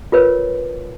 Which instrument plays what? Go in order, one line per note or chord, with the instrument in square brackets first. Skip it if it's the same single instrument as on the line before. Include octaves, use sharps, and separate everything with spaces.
[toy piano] F4 A#4 B4 C#5